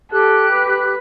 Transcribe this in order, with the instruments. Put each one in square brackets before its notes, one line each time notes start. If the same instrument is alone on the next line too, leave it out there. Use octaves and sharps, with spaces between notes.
[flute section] G4 F#6 [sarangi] A4
[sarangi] B4